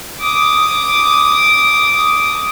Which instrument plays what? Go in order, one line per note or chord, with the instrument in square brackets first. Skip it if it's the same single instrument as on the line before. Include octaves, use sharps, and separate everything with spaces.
[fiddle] D6 D#6